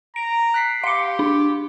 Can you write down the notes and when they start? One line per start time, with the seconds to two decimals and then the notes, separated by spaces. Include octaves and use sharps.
0.16 A#5 D7
0.54 F#6 B6 C7
0.84 G4 F5 C6 D6 C#7
1.19 D4